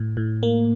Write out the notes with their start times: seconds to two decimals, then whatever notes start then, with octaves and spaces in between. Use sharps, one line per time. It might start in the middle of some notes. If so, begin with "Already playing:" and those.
Already playing: A2
0.17 A2
0.43 A#3